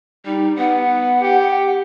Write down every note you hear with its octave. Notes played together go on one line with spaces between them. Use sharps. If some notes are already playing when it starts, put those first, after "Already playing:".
G3 D#4
B3 F#5
G4